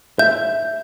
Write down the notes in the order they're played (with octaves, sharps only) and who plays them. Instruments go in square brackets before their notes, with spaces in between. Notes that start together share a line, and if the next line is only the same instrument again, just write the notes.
[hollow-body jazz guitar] E5 [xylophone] G6